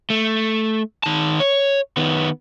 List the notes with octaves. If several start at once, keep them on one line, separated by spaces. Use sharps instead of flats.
A3
D#3 A5
C#5
D#3 B3